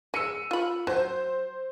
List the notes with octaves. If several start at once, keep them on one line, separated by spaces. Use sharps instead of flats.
G#3 E6 C#7 D#7
F4 B5
F#3 C5